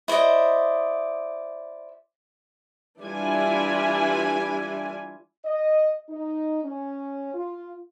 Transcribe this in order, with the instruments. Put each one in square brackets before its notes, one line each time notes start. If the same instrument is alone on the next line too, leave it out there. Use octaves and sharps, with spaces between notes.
[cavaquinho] E4 C5 D5 D#5
[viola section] E3 G3 D4 E4 F4 G#5
[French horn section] D#5
D#4
C#4
F4